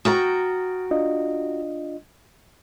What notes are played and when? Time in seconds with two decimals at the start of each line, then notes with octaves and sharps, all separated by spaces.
0.05 F#4 G5 A#5 D#6 F6 A6
0.91 D4 F4 D#5